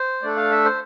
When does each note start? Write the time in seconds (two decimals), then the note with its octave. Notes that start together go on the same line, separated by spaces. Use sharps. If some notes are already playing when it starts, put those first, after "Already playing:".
Already playing: C5
0.22 A3 D4 A4 D5
0.37 F5
0.51 E5
0.65 C5